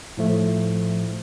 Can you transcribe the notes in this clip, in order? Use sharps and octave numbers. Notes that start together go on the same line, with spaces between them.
A2 F3 A3